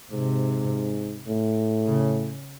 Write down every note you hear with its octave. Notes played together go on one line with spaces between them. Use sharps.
G#2 C3
A2
C#3